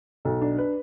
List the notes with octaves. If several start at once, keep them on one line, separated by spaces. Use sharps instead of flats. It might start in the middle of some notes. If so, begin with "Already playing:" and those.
B1 A4
D4
B4